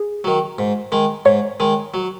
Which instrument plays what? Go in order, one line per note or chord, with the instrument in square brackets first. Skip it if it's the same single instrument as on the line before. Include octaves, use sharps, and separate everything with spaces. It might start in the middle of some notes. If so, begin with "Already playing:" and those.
Already playing: [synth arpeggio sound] G#4
[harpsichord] D#3 F#3
G#2
D#3 G#3
[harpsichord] G#2 [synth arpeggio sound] C#5
[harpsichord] D#3 G#3
F#3